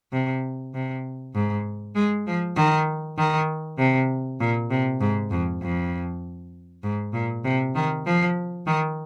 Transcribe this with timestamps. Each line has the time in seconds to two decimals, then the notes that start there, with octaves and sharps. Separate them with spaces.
0.12 C3
0.74 C3
1.34 G#2
1.95 G#3
2.27 F3
2.56 D#3
3.18 D#3
3.78 C3
4.40 A#2
4.71 C3
5.01 G#2
5.31 F2
5.61 F2
6.83 G#2
7.13 A#2
7.44 C3
7.75 D#3
8.06 F3
8.66 D#3